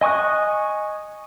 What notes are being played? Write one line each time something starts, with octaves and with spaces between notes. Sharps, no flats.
D#5 G#5 C#6 D#6 F#6